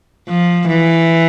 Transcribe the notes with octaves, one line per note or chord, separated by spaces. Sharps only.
F3
E3